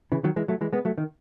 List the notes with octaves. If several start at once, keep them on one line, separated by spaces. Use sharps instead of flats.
C#3 E3
D#3 F#3
E3 G#3
F#3 A3
E3 G#3
G#3 B3
F#3 A3
D#3